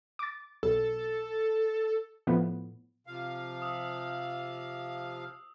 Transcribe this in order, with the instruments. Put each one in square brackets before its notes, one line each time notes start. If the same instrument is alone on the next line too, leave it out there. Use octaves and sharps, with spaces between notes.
[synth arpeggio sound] D6 A6
[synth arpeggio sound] B1 [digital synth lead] A4
[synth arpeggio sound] A2 F3 B3
[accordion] C3 F3 F5
[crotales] D#6 E6